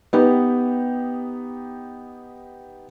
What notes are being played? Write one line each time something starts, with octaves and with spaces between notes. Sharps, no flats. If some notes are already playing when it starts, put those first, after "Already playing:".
B3 D#4 G4 B4